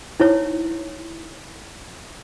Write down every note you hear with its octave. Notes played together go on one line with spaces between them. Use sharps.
D#4 E4 C#5